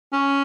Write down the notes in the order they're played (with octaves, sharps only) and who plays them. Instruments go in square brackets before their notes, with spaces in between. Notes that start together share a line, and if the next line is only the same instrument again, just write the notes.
[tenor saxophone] C#4